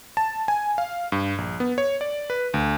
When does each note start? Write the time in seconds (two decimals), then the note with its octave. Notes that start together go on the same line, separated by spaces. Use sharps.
0.17 A5
0.48 G#5
0.78 F5
1.12 G2
1.38 A#1
1.60 B3
1.78 C#5
2.01 D5
2.30 B4
2.54 D2